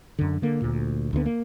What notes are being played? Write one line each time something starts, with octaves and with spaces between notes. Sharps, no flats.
F#2 D3
D3 A#3
D2 A#2
D2 D3 D#3 B3
A#3